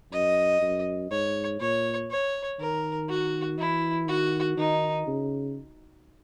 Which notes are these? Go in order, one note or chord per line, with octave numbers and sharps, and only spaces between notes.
F#2 D#5
F#2
G#2 C#5
A#2 C#5
C#5
D#3 A#4
F#4
E3 E4
D#3 F#4
D#3 D#4
C#3